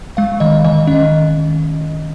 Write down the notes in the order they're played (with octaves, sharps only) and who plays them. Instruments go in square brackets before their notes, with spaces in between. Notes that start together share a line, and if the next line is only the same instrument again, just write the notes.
[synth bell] G#3 F5
D#3 D#5
D#3 D#5
C#4 D#5